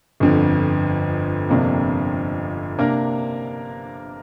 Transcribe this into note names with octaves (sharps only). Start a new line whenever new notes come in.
G1 F2 D3
G1 F2 C3 A#3 D4
C3 A#3 D4 A#4